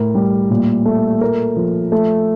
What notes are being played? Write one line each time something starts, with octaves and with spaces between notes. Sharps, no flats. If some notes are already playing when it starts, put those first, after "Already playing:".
Already playing: A2 A#4
G3
A#2
A3
A3 A#4
F3
A3